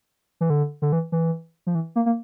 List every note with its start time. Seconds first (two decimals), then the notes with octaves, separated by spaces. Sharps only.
0.41 E3
0.50 D3
0.82 D3
0.92 E3
1.12 E3
1.67 F3
1.75 E3
1.96 A#3
2.06 A#3